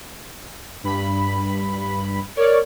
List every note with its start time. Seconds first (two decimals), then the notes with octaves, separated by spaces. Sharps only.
0.84 G2 B5
2.37 A#4 C#5 D5